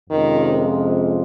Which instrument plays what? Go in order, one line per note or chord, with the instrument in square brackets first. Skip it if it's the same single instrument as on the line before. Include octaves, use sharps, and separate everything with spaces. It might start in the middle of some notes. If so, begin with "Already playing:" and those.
[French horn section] F2 C3 F3 G#3 C#4 [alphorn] D#3